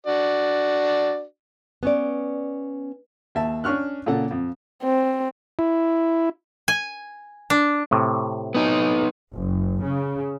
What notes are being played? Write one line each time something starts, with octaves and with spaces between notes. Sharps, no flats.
D4 F#4 D5
B3 C#4 D5
D#2 E5 A5
C#4 D4 C#6 F6 F#6
A#2 C#3 A4 F#5
F2
C4
E4
G#5
D4
A2 C3
B3 D#4
F#1
C#3